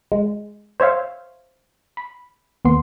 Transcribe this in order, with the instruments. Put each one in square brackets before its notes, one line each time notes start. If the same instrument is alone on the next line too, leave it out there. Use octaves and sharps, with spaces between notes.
[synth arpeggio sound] G#3
C5 C#5 E5 F5
B5
D#2 B3 C6